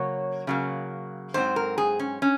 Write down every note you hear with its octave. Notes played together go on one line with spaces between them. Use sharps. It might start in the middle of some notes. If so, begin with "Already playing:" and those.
Already playing: C#3 F#3 A#3 C#5
C#3 F#3 A#3
G#2 F#3 C4 C5
A#4
G#4
C#4
C#4